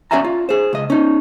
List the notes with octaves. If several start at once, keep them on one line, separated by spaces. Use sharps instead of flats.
C#4 F#4 D5 E5 G#5 A#5
F4
G#4 C5
C#2 D#5
C#4 D#4